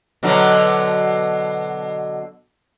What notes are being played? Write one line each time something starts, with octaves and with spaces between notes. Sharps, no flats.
B2 D3 F#3